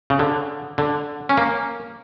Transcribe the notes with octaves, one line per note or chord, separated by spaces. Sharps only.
C#3
D3
D3
C#4
A#3